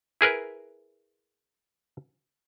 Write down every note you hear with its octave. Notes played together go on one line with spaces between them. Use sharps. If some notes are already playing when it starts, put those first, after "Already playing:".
E4 G#4 A#4 B4